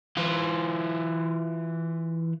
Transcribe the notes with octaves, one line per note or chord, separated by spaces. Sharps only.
E3 F4